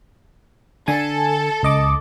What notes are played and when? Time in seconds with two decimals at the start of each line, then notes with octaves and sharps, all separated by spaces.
0.88 D3 A4 G#5
1.63 C#2 D#5 D6